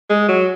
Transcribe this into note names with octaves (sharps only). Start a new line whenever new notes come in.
G#3
F#3